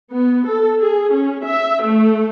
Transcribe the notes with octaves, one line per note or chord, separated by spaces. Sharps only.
B3
A4
G#4
C#4
E5
A3